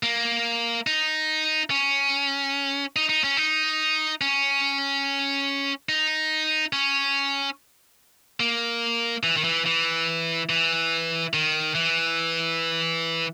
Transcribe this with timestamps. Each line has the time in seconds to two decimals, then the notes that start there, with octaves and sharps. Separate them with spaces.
0.03 A#3
0.87 D#4
1.71 C#4
2.96 D#4
3.09 D#4
3.24 C#4
3.37 D#4
4.21 C#4
5.89 D#4
6.73 C#4
8.40 A#3
9.23 E3
9.37 D#3
9.44 E3
9.66 E3
10.49 E3
11.34 D#3
11.75 E3